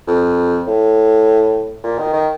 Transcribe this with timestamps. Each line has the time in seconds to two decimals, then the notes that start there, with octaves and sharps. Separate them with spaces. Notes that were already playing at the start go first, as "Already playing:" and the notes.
0.08 F2
0.67 A2
1.84 A#2
1.99 D#3
2.14 D#3